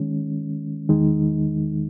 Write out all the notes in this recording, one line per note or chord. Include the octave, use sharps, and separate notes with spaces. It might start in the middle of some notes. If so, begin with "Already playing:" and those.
Already playing: D#3 G#3 C#4
E2 D#3 G#3 D#4